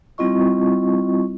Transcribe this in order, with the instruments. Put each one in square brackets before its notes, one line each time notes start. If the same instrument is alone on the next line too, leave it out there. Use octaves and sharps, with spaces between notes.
[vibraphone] G3 C4 E4 F4 D#5 C#6